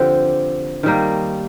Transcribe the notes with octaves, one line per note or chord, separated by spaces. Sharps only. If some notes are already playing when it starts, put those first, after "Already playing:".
Already playing: D3 F3 C4 G4
D#3 G3 A#3